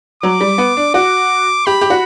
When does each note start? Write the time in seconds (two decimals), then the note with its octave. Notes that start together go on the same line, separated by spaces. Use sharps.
0.23 F#3 D6
0.41 G3
0.58 B3
0.77 D4
0.94 F#4 D6
1.66 G4 B5
1.81 G4
1.90 F#4